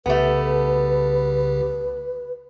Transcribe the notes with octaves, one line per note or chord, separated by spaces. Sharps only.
C2 C#3 A3 B3 G4 B4